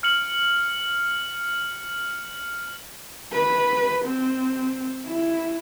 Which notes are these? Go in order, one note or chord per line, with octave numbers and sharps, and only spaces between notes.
F6 C#7 F#7
B4
C4
E4